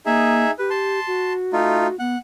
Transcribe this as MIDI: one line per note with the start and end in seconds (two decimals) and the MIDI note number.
0.06 0.44 58
0.06 0.51 63
0.06 0.51 68
0.06 0.51 76
0.59 1.00 67
0.59 0.69 71
0.70 1.33 81
0.70 1.33 84
1.07 1.98 66
1.53 1.87 57
1.53 1.87 63
1.53 1.87 65
1.99 2.16 59
1.99 2.18 78